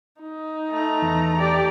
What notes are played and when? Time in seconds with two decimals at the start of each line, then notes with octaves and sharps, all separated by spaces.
0.22 D#4
0.70 A3 A#5
1.02 E2
1.38 G4 D5